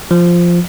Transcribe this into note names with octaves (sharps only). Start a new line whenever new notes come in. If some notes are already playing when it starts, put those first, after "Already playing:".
F3